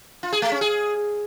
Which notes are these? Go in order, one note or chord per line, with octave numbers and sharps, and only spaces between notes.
F4
G#4
A3
C#4
G#4